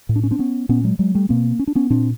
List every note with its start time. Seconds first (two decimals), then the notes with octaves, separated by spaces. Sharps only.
0.09 A2
0.16 D4
0.23 C#4
0.31 C4 D4
0.39 B3 C#4
0.69 A#2 B3 C#4
0.84 F#3 G#3
0.99 F#3 G#3
1.14 G3 A3
1.29 B2 A#3 C4
1.59 C#4
1.67 D4
1.75 B3 C#4
1.90 A#2 C4 D4